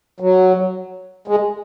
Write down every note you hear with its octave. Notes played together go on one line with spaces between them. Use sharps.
F#3
G#3